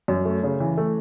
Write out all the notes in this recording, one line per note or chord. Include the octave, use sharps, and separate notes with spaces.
F#2
A3
C#3
E3
A3